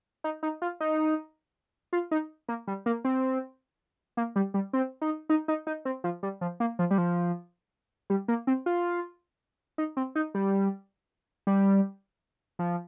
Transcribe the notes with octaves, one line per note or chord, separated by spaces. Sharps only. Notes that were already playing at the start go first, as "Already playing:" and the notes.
D#4
D#4
F4
D#4
F4
D#4
A#3
G3
A#3
C4
A#3
G3
G3
C4
D#4
D#4
D#4
D#4
C4
F3
G3
F3
A#3
F3
G3
F3
G3
A#3
C4
F4
D#4
C4
D#4
G3
G3
F3